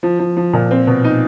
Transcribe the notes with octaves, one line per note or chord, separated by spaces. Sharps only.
F3
F3
F3
A#2
C4
B2
D#4